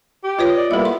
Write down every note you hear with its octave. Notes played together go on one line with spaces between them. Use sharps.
G4
F4 B4 C#5 D#5
D5
G3 A#3 B3 E4 A4 D#5
B3 C6